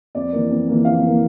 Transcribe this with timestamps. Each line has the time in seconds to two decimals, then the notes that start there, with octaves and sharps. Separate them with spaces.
0.15 F2 D5
0.33 E3 A#3
0.50 F2
0.67 E3 A#3
0.85 F2 F4 F5
1.02 E3 A#3